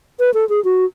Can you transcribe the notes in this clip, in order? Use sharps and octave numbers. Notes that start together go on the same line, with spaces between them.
B4
A4
G#4
F#4